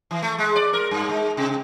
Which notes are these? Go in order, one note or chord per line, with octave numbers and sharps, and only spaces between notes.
E3
A3
G#3
D5
A#4
G2
G#3
C3